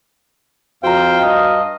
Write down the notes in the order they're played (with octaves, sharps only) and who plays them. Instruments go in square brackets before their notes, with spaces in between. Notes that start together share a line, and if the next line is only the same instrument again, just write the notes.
[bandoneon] F2 C5 G5 [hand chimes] F#4 A#5 [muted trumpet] F5
[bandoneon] G2 [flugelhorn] D#5